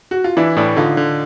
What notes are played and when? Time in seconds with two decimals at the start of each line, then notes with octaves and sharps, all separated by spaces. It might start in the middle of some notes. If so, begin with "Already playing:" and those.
0.11 F#4
0.24 F4
0.37 E3 D4 E4
0.57 A2 D4 E4
0.76 D3 D#4 F4
0.97 D3